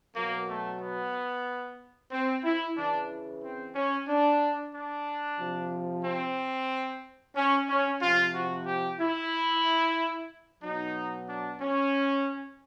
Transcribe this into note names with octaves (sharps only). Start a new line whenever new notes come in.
B2 F#3 A#3
A3
B3
C4
E4
C#3 E3 D4
C4
C#4
D4
D4
C3 F3
C4
C#4
C#4
C3 F3 F4
F#4
G4
E4
B2 F#3 D#4
D4
C#4